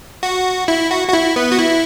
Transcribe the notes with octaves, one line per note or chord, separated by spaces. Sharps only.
F#4
E4
F#4
F#4
E4
B3
F#4
E4